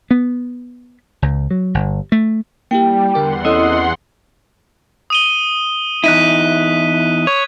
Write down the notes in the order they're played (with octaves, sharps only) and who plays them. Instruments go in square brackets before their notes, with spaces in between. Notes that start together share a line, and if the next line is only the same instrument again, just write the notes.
[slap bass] B3
C#2
F#3
G1
A3
[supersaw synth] G3 [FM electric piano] A#3 E4 G4 [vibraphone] G5
[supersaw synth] E2 F#5 C6 [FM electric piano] D3 A#4 D6
[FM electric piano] C4 C#4 A4 [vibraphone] E4 D#5 D#6
[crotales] D#6 D#7 G7
[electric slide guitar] E2 D#4 E4 [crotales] F#6 B6 D#7
[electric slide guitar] C#5 [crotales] G#6